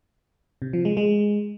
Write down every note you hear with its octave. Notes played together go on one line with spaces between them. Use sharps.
C3
F3
G#3
G#3